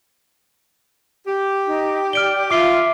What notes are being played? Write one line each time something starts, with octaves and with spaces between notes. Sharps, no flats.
G4
D#4
D5 F6 D7 G7
F4 E5 D6 C7 G7